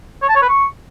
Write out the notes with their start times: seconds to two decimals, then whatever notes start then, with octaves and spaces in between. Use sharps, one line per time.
0.22 C#5
0.29 A5
0.35 C#5
0.42 B4
0.49 C#6